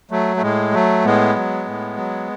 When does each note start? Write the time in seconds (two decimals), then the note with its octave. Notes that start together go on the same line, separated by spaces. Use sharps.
0.11 F#3 A3
0.37 A3
0.42 A2 G#3
0.73 F#3 A3
1.04 A2 G#3 B3
1.36 F#3
1.66 A2
1.97 F#3